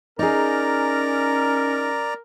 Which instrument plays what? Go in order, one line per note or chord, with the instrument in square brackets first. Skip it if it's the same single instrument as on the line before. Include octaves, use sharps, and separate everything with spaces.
[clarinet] C#4 [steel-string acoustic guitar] D#4 G#4 [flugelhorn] A#4 [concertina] D5 A#5